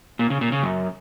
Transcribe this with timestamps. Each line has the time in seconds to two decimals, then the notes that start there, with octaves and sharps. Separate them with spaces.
0.19 A#2
0.30 C#3
0.41 A#2
0.52 C#3
0.63 F#2